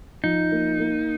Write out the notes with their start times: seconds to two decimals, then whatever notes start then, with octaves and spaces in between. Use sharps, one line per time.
0.24 F3 D#4
0.52 A#3
0.79 A#3